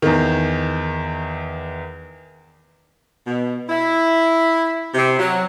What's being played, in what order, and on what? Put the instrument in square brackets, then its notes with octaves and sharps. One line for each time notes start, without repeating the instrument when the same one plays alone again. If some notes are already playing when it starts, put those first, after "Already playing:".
[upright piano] E2 D#3
[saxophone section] B2
E4
C3
F#3